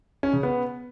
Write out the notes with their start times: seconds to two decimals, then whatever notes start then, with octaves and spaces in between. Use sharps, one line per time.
0.23 C#4
0.33 C#3
0.43 B3